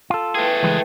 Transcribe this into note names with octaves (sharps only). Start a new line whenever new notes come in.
F4 A4
A3 E4 G#4 B4 G5
C#2 E3 G#3